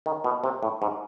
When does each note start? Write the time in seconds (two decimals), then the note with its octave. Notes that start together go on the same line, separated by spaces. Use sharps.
0.06 D#3
0.24 B2
0.44 C3
0.63 A2
0.82 G#2